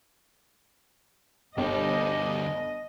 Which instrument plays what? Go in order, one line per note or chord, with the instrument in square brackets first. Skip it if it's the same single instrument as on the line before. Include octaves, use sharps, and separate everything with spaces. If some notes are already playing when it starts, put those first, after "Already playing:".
[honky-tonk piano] G1 [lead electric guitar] D2 G3 [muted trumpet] G4 [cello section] D#5